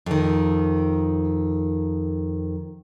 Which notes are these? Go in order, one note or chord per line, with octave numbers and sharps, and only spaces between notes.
F2 D#3